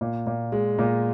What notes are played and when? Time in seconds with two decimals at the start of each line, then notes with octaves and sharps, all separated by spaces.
0.01 A#2
0.27 A#2
0.52 G#3
0.78 A#2